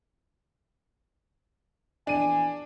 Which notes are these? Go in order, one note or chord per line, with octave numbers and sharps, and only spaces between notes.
A#1 E2 D4 G#5 D#7